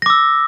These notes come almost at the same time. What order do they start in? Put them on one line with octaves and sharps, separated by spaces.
A#6 D6 E6